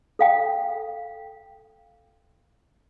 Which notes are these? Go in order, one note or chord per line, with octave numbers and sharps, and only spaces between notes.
A4 F5 G5